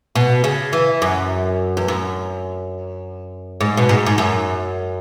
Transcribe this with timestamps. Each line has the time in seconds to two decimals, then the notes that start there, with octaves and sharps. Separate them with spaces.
0.15 B2
0.44 C#3
0.73 E3
1.02 F#2
1.77 E2
1.88 F#2
3.61 G#2
3.77 B2
3.89 G#2
4.06 G#2
4.18 F#2